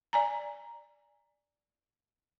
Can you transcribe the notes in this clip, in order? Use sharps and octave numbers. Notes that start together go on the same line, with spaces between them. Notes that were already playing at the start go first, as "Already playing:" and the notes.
D5 G#5 A#5